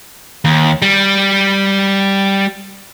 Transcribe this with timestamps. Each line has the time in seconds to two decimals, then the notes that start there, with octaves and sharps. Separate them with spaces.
0.45 D#2
0.82 G3